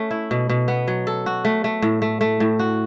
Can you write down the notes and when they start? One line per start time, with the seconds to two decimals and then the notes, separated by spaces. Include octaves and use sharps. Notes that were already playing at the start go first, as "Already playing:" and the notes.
Already playing: A3 C#4
0.11 E4
0.31 B2
0.49 B2
0.68 B3
0.88 F#3
1.07 A4
1.26 F#4
1.45 A3
1.64 A3
1.82 A2
2.02 A3
2.21 A3
2.40 A2
2.59 F#4